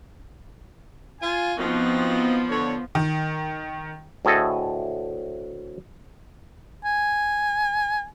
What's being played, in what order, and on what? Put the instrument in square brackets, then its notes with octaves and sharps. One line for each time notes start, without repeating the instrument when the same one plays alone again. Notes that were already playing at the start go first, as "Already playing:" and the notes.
[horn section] F4 G#5
[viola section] F3 B3 [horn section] C4 D#4 F#4
[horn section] D3 C#5
[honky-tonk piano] D#3
[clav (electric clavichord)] D2 A2 G#4 A4 D#5
[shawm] G#5